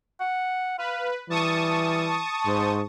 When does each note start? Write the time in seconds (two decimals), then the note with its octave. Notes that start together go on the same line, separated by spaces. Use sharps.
0.20 F#5
0.78 B4 F5
1.30 E3 G3 A5 C#6 D#6
2.46 G#2 C5